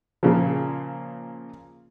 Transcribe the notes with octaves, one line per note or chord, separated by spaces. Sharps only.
A#2 C#3 F3